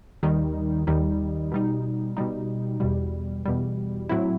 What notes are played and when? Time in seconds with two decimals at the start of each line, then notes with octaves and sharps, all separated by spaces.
0.23 D#2 D#3 G3 D#4
0.87 D#2 D#3 G3 D#4
1.52 B2 G3 D#4
2.17 B2 G3 D#4
2.80 E2 B2 G3
3.45 E2 B2 G3
4.09 A2 F#3 C4 E4